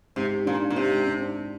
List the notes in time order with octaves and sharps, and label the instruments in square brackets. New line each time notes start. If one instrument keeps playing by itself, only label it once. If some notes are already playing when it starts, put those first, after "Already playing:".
[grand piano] G#2 [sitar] C3
[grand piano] G4
[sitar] A#2 [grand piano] D4
[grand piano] D4
[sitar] A#2
[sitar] C3 [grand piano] G4
[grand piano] G#2
D4
D4